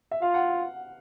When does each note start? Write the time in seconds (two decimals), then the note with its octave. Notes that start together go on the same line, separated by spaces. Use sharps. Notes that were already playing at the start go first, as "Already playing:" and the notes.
0.11 E5
0.22 F4 F5
0.34 F#5